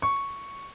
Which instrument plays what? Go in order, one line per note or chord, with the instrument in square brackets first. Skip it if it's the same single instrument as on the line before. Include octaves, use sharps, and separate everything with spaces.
[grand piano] C#6